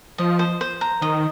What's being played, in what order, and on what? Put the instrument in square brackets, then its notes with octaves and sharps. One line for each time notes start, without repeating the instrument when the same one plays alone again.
[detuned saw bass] F3 [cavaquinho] D#5
[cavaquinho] C5
C5
A#5
[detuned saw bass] D#3 [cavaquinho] D#5